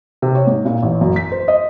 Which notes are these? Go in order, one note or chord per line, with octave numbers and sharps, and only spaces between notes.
C3
C#5
G#2
A#2
A1
F#2
B6
C5
D#5